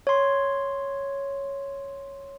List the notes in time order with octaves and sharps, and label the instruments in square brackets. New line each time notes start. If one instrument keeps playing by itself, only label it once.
[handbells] C#5 C6